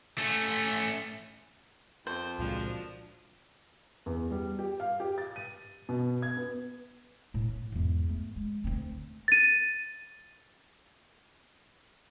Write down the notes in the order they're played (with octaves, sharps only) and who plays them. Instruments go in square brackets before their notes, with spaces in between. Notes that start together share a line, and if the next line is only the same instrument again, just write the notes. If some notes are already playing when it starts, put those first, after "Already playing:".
[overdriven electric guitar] A3 C#4
[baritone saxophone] F2 [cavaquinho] C5
[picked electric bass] C#2 A#2 G#3 [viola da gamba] F3 D4 F#4
[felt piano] E2
G3
G4
F5
G4
A6
D#7
B2
G#6
B3
[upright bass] A2
C#4
E2 G#2
A3
G#3
D2 C4
[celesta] A6 D#7